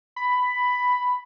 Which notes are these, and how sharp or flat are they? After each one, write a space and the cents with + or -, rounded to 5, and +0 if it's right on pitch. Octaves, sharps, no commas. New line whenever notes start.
B5 +10